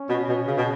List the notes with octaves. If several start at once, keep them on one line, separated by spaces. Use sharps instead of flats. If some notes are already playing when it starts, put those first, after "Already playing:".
Already playing: C#4
B2
B2
C#3
B2